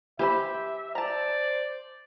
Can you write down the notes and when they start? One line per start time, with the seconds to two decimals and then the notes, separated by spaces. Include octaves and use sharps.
0.19 E3 G4 C5 E5 B5
0.95 C5 D5 A5 A#5